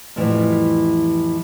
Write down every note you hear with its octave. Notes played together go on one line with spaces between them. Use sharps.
F2 A2 E3 G3